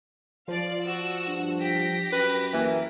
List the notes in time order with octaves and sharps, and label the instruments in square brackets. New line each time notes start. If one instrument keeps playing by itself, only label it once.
[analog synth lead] F3 [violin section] D5 F5
[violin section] F#4 E6
[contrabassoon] G2
[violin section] G4 A#6 B6
[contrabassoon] F#2 [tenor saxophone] B4
[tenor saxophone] E3 [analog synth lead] A#3